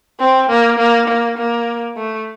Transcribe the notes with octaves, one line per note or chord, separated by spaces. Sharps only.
C4
A#3
A#3
A#3
A#3
A3